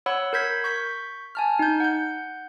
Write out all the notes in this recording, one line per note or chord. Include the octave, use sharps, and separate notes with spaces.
C#5 F#5 B5 E6
A#4 B5 G6 G#6 B6
C#6 G6 B6
G#5 A5 F6
D#4 G6
F#5 G6